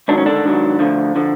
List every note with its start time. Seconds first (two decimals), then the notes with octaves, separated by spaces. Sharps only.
0.08 G#2 D#3 F#3 D4
0.18 C#4
0.26 D3 D4
0.44 G#2 D#3 F#3
0.79 D2 D3 F3
1.16 D3 F3